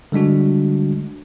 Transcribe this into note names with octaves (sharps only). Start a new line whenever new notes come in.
D3 G3 G#3 D4 F#4